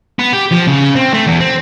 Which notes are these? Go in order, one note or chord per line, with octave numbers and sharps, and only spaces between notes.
B3
G4
F3
C#3
C4
A3
E2
C4